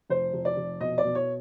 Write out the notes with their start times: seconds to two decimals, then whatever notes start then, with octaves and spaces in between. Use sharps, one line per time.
0.10 F1 C5
0.34 F1
0.45 D5
0.57 F1
0.81 B2 D#5
0.98 D5
1.04 B2
1.15 C#5